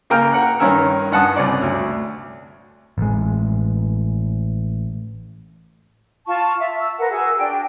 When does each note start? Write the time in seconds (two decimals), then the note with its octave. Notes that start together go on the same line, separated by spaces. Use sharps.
0.10 C#3 A#3 G5 F6
0.33 A#4 F#5 F#6
0.60 G2 D#3 C#4 A#4 E6
1.12 G2 F#5 A5 D#6
1.36 C2 C#4 D5
1.62 D2
2.98 A1 G#3
6.27 F4 A5 C#6
6.59 E5
6.81 E6
6.99 A#4 B4 F#5
7.11 F#4 G#4 E6
7.38 D4 G5